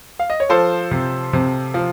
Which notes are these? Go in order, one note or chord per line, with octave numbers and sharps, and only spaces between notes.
F5
D#5
C#5
F3 A4 C5
C3
C3
F3